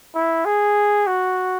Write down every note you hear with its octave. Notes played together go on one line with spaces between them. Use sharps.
E4
G#4
F#4